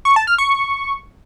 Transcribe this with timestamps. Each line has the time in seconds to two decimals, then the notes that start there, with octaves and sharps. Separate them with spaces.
0.05 C#6
0.16 A5
0.27 F6
0.38 C#6